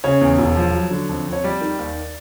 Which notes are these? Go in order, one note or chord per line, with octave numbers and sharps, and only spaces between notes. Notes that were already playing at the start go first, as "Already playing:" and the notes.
C#3 C#5
E2
E1
F3
F#3
D3
F2
F2
C#5
G3 D5
D#3
D#2